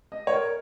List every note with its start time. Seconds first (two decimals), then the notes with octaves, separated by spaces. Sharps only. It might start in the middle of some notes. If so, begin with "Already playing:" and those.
0.12 D#5
0.27 C#5
0.33 A#4